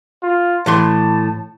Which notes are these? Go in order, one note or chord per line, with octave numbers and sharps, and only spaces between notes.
F4
A2 E3 A5 C6